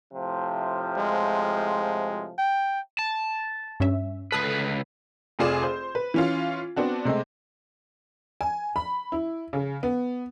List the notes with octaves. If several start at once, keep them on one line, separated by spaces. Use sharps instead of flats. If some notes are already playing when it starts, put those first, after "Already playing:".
A2 C3 F3
G#3
G5
A5
G2 C#4 E5
C#2 A4 B4 D#6 C7
F1 C4 F4 G#4 D5 E7
C5
B4
E3 C#4 F4
B3 C4 D4 F#4
C3 G#3 A3 C4
G#5
B5
E4
C#3
B3